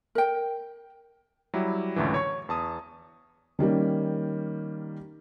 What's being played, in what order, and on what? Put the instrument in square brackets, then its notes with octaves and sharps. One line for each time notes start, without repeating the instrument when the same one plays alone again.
[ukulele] A#4 G5
[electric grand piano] F#3 G3 E4 G4
C#2 F#2 A2 D3 E3
C#5 C#6
E2 A5 D#6
[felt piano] D#3 G3 A#3 C#4